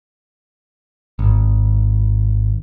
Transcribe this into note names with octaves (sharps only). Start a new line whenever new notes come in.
G#1